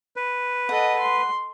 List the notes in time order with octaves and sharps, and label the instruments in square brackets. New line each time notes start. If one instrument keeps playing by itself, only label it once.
[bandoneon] B4
[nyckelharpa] A4 D#5 [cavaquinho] F#5
[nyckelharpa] C6